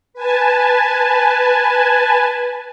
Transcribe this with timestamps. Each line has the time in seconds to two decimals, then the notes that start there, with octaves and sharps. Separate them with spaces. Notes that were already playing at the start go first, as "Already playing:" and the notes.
0.14 B4 G#5 A5